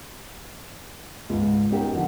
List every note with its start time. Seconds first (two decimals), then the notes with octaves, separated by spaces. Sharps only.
1.29 C#2 G#2
1.71 B3 C#4 D#4 G4 A#4 G5
1.94 D3 F3 G3